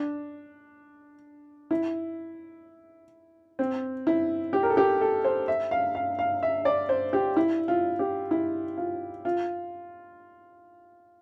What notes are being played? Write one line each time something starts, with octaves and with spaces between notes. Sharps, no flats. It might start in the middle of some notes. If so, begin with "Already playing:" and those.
Already playing: D4
E4
C4
E4
G4
A#4
A4
G4
A4
C5
E5
F5
F5
F5
E5
D5
C5
G4
E4
F4
G4
E4
F4
F4